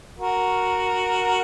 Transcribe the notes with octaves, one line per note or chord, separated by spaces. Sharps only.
F#4 A#4